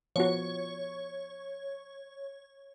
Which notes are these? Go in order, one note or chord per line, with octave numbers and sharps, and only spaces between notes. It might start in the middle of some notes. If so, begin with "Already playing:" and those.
F3 B3 F#4 C#5